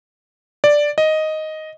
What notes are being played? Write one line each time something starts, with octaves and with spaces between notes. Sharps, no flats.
D5
D#5